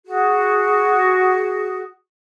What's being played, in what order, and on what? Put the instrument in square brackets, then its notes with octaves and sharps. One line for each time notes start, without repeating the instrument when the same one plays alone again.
[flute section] F#4 G#4